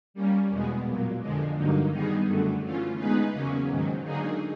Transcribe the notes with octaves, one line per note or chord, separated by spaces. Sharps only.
G3 A#3 C#4
E2 B2 G#3 B3
A#2 F#3 A#3
F2 D3 F3 G#3
G2 D3 F#3 A#3 D#4
D#3 G3 B3 D#4 G#4
F#2 D3 F#3 A3
E3 A3 C#4 F4
G#3 B3 D#4 G#4 B4
E2 C#3 F#3 A#3 C#4
G#2 D#3 F#3
D3 F#3 A#3 D#4 G#4